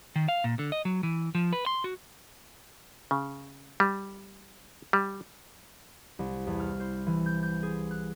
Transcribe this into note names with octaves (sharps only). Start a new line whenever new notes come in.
D#3
F5
A#2
D3
D#5
F#3
E3
F3
B4
C6
F#4
C#3
G3
G3
C2
E2
F6
C5
E3
G6
G6
G#4
F#6